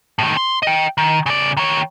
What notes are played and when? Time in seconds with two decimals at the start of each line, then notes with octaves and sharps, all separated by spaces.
0.19 A2 D#3
0.37 C6
0.63 D#5 G5
0.98 D#3
1.26 C#3 D5
1.57 D#3 C#5